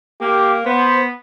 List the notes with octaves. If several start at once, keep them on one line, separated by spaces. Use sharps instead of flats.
A#3 G4
B3 C5